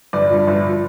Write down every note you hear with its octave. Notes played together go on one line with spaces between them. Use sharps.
G1 D5
G2 F3
G1
F3